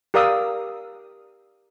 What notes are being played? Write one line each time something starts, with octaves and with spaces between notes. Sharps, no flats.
G4 A#4 D5 F5 D#6 E6